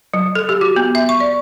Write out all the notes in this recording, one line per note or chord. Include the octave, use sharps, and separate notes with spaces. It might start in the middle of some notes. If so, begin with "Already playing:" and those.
F#3
A4
G4
F#4
B3
E5
C#6
D5